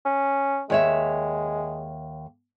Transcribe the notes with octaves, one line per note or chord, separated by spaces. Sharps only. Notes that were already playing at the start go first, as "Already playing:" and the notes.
C#4
D#2 G#3 C#5 E5